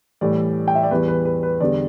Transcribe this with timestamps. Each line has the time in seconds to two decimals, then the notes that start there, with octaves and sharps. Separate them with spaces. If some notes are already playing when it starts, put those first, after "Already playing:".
0.21 A2 E3 G3 D5
0.68 G5
0.75 E5
0.83 D5
0.91 E2 E3 G3 B4
1.08 B4
1.25 B4
1.43 B4
1.60 E2 D3 G3 D5